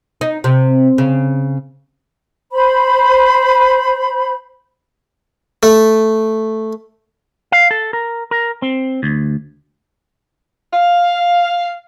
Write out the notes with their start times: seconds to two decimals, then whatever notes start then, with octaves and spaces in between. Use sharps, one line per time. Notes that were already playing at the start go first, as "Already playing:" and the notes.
0.21 D#4
0.44 C3
0.98 C#3
2.52 C5 B5
5.63 A3
7.52 F5
7.71 A4
7.93 A#4
8.31 A#4
8.62 C4
9.03 D2
10.74 F5